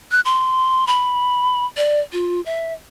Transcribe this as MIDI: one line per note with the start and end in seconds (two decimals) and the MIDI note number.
0.12 0.20 90
0.25 0.85 84
0.87 1.66 83
1.77 2.00 74
2.13 2.41 65
2.46 2.73 76